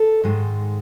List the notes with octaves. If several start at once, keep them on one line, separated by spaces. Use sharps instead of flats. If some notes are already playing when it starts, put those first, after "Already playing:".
Already playing: A4
G#2 D#3 G#3